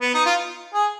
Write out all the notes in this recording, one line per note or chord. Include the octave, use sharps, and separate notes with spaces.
B3
D#4
F4
G#4